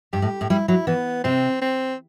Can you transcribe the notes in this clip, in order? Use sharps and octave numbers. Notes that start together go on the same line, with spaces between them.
G2 G4
A2
A2
G3 E4
F#3 E4
E3 B3
C3 C4
C4